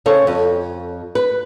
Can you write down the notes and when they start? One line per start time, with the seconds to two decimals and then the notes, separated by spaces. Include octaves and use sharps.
0.06 C#3 A4 C5 C#5
0.27 F2
1.15 B4